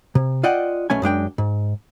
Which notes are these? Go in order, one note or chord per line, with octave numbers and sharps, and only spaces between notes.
C3
F4 D5 D#5 F#5 G5
B1 A3 C#4 G#5
F#2 G#3 D4 G5
G#2